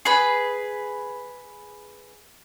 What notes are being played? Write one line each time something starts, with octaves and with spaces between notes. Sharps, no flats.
G#4 B4 B5